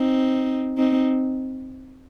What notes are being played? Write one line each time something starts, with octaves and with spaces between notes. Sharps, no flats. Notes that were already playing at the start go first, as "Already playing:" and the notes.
Already playing: C4 D#4
C4 D#4